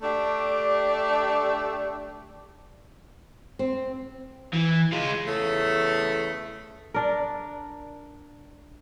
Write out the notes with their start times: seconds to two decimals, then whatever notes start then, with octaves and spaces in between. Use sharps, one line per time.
0.03 A3 D4 G4 D5
3.59 C4
4.53 E3
4.92 G#3 F4
5.27 E2 C#3 A3
6.94 D4 A#4